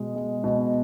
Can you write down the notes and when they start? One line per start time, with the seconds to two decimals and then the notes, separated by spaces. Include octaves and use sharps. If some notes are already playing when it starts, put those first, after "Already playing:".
Already playing: B2 G#3
0.16 G#3
0.44 B2